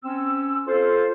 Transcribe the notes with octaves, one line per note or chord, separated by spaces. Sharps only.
C4 C#4 E6
F4 A4 C5